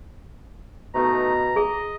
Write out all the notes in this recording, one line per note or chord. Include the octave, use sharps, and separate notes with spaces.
B2 A3 D#4 A#5
G#4 D#5